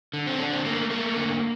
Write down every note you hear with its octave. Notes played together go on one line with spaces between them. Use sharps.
D3
C4
D3 D4
C4
A3 A#3
A3 A#3
D3